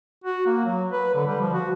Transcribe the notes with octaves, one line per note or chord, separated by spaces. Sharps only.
F#4
A#3
F#3
B4
D3
G3
F3
F#4